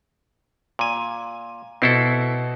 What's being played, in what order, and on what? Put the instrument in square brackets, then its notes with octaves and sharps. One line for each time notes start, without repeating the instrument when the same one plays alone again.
[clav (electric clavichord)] A#2 G#5
[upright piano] B2 C7 [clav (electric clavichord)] C4 E4 A4